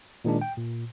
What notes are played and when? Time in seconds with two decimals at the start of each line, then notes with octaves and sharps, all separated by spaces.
0.25 A#2 D#3 G#3 D4
0.41 G5
0.57 A#2